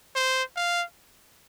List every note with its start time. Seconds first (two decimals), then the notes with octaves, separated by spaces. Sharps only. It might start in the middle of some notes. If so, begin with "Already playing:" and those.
0.16 C5
0.56 F5